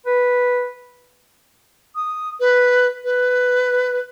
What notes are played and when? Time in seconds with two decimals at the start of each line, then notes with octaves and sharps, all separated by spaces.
0.06 B4
1.96 D#6
2.40 B4
3.04 B4